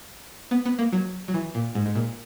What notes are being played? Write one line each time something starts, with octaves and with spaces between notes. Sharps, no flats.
B3
B3
A#3
F#3
F#3
E3
A#2
G#2
G#2
A#2